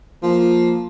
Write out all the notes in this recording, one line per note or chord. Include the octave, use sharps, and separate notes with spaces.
F3 A#3